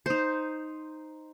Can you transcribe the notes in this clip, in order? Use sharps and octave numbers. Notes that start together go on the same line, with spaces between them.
D#4 C5